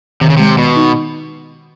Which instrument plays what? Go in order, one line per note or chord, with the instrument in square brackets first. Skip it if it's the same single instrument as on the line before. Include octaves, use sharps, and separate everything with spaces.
[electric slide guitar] C3 [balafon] D#3
[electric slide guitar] C#3
[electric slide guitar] C3 [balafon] G#3
[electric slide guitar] B2 [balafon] B3
[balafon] D#4